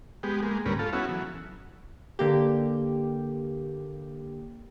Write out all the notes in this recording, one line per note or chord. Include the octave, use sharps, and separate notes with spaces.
G#3 B3 G4
G#3 A#3
D2 G#2 G3 C#4 A#4 B4
F4 A4
B3 C#4 E4 F#4
E3 F#3
D3 A#3 G4